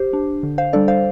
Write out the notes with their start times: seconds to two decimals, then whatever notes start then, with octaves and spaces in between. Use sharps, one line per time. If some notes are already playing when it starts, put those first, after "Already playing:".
Already playing: G4 C5
0.13 D4
0.43 D3
0.58 C5 F5
0.73 G3 D4 A4 D5
0.88 C5 F5